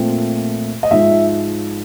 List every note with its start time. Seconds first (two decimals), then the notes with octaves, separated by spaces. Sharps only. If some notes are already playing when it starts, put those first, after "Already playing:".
Already playing: A#2 F3 A3 C4
0.83 D#5
0.91 G#2 F3 G#3 E5